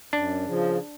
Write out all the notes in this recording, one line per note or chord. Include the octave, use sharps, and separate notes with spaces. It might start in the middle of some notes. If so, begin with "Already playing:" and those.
F#2 D4
C#3 F3